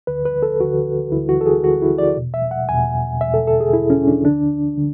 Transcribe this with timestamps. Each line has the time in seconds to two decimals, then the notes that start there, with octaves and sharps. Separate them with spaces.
0.07 D2 D3 B4
0.25 B4
0.43 A4
0.60 D2 D3 F#4
1.12 D2 D3 E4
1.29 F#4
1.41 A4
1.46 G#4
1.64 D2 D3 F#4
1.82 E4
1.98 D5
2.17 E2 B2
2.34 E5
2.51 F#5
2.69 E2 B2 G#5
3.21 E2 B2 E5
3.34 A4
3.47 A4
3.60 G#4
3.73 E2 B2 E4
3.90 C#4
4.08 D4
4.25 D2 D3 D4
4.77 D3